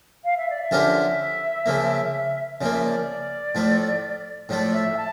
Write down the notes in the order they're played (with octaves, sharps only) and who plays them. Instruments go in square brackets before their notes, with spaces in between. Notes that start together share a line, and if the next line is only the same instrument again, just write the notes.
[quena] F5
E5
D5
E5
[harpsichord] D3 F3 C#4 G4 A#4
C#3 F3 A#3
[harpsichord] C#3 F3 A#3 [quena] D5
[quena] E5
D5
[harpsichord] A2 F3 A3
[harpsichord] A2 F3 A3 [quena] D5
[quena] E5
A5